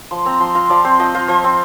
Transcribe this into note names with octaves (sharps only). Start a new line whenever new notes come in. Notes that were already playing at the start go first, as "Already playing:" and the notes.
F3 C6
C4 A#5
F3 C6
F4 A#5
F3 D5
C4 C5
F3 D#5
F4 C5
F3 C5
C4